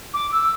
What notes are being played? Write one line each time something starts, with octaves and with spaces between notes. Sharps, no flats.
D6
E6